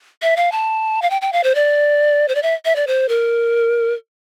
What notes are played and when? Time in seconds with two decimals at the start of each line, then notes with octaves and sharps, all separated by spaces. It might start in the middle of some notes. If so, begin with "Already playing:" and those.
0.22 E5
0.37 F5
0.52 A5
1.02 F5
1.10 G5
1.22 G5
1.33 F5
1.44 C5
1.55 D5
2.28 C5
2.35 D5
2.43 E5
2.65 E5
2.76 D5
2.87 C5
3.09 A#4